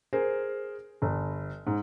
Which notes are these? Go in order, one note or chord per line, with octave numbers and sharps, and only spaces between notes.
G#4 A#4 C5
G1
G#2